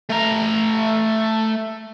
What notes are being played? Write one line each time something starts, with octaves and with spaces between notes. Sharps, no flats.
A3 A#5